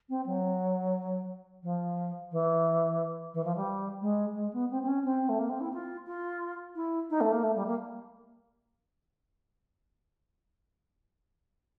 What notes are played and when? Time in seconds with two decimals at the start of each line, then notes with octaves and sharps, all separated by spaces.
0.09 C4
0.26 F#3
1.63 F3
2.31 E3
3.34 E3
3.44 F3
3.56 G3
4.01 G#3
4.35 G#3
4.53 B3
4.70 C4
4.82 C4
4.87 C#4
5.04 C4
5.29 A3
5.39 A#3
5.49 C4
5.60 E4
5.73 F4
6.06 F4
6.75 E4
7.10 D#4
7.20 A3
7.32 A#3
7.43 A3
7.55 G3
7.66 A#3